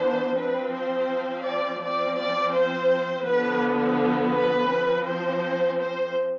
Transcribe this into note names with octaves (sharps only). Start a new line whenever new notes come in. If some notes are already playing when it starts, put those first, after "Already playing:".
Already playing: E3 B3 D4 C5
F3 C4 B4
C5
D5
F3 C4 D5
D5
C5
D3 F3 B3 B4
B4
F3 C4
C5
C5